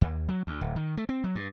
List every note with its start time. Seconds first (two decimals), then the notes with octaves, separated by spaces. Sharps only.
0.01 D#2
0.29 F#3
0.47 D2
0.61 D1
0.76 D#3
0.97 A3
1.09 C4
1.24 F#3
1.35 G2